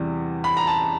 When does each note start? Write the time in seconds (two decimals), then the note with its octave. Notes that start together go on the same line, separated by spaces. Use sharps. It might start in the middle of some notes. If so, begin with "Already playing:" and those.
Already playing: E2 C3 E3 G3
0.44 B5
0.57 A#5
0.67 A5